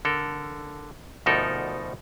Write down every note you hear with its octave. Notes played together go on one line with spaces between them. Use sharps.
D3 A4 A#4
D2 B2 F3 D#4 A4 A#4